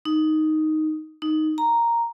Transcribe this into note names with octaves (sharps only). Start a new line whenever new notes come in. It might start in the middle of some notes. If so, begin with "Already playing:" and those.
D#4
D#4
A#5